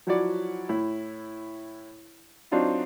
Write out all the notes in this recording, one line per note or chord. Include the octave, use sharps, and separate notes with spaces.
F3 F#3 E4 F#4 C#5 D5
A2 E4
F#3 C4 D4 D#4 F4 F#4